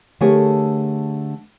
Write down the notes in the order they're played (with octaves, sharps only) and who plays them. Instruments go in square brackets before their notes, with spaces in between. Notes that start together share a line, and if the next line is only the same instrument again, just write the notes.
[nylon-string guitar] D3 A3 G4 G#4 A#4 C#5